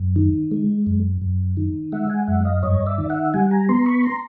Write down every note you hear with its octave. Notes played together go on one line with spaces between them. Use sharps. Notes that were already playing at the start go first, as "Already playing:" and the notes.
Already playing: F#2
D#3
G#3
F#2
F#2
D#3
G#3 E5 F#5
F#5 G#5
F#2 E5 F#5
D#5 F5
G2 C#5 D#5
D5 E5
D#3
E5 F#5
G3 F#5 G#5
G#5 A#5
B3 A#5 C6
B5 C#6
A#5 C6